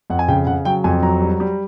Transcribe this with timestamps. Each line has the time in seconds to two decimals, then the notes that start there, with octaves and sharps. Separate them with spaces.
0.10 F2 F#5
0.19 G#5
0.28 C#3 G5
0.47 C#3 F#5
0.65 F#3 G5
0.84 F2 G#5
1.02 F#3 A#5
1.21 G3
1.40 G3